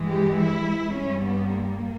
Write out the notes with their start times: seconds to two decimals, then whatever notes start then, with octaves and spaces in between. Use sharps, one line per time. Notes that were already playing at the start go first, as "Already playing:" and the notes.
Already playing: G2 E3 G#3
0.08 G4
0.36 E4
0.95 G2 G3 C#4
1.24 B3
1.53 A#3